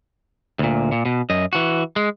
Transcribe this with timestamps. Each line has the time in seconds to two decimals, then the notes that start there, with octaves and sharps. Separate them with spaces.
0.59 D2 A#2
0.92 A#2
1.05 B2
1.30 F#2 D#5
1.53 E3 F#4
1.96 G#3